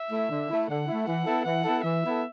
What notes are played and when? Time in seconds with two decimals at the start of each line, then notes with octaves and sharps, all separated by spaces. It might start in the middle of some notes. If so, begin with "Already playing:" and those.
Already playing: E5
0.10 A3 E4
0.29 D3
0.49 A3 E4
0.68 D3 F#5
0.87 A3 E4
1.06 E3 F#5
1.25 B3 E4 A4
1.45 E3 F#5
1.64 B3 E4 A4
1.83 E3 E5
2.03 B3 E4 A4